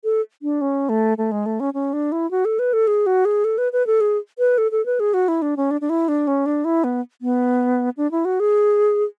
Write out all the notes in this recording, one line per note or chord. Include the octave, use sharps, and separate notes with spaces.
A4
D4
C#4
A3
A3
G#3
A3
C#4
C#4
D4
E4
F#4
A4
B4
A4
G#4
F#4
G#4
A4
B4
B4
A4
G#4
B4
A4
A4
B4
G#4
F#4
E4
D4
C#4
D4
D4
E4
D4
C#4
D4
E4
B3
B3
D4
E4
F#4
G#4